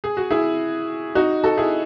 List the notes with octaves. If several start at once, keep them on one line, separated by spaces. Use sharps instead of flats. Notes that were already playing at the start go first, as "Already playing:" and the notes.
G#4
F#4
E4 G#4
D#4 F#4
F#4 A4
E4 G#4